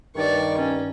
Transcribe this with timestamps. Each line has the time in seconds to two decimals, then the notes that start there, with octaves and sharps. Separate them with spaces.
0.16 G2 D#3 D5 C#6
0.58 C#4